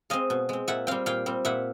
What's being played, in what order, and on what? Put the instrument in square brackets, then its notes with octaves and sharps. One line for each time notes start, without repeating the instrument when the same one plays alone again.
[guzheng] G#3 C4 D#5 F5
B2
G#3 C4
A#2 E5 F#5
G3 C4 F5 G5
A#2 F5 G5
G3 C4
A#2 E5 F#5